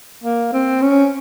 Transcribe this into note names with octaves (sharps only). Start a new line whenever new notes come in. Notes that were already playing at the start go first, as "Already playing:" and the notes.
A#3
C4
C#4